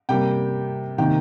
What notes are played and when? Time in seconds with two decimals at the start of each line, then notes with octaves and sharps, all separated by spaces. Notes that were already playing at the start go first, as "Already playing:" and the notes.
0.09 C3 G3 A#3 G5
0.98 C3 D#3 A#3 G5